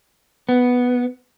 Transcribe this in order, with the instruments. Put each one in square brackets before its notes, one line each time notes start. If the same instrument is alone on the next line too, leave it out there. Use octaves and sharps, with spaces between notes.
[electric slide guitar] B3